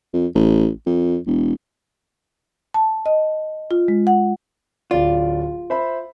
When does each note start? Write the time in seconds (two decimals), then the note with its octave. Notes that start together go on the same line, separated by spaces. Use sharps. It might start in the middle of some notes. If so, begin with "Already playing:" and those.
0.13 F2
0.35 A1
0.86 F2
1.26 E1
2.74 A5
3.06 D#5
3.71 F4
3.88 G#3
4.07 F#5
4.91 D1 F4 D5
5.70 C5 E5 B5